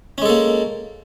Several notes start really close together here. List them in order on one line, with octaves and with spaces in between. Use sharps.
C#4 G#3 A4 A#3